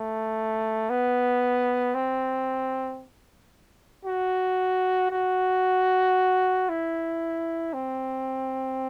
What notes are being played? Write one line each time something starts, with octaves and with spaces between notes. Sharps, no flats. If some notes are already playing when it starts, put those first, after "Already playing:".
Already playing: A3
B3
C4
F#4
F#4
E4
C4